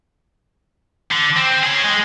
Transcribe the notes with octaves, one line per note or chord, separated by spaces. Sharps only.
D3
C4
G#4 C#5
G#3